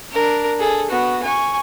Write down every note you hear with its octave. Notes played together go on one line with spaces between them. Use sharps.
D4 A#4
G#4 A4
B3 F#4
G#5 C#6